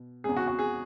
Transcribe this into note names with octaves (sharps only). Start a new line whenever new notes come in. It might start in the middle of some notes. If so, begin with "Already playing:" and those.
Already playing: B2
E2 C#3 G#3 G#4
F#4
F#4
G#4